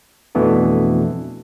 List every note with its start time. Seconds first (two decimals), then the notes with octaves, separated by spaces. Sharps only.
0.35 F2 B2 E3 A3 B3 D4